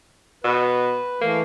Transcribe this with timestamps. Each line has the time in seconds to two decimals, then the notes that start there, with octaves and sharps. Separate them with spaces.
0.44 B2 B4
1.21 E3 A3 A#3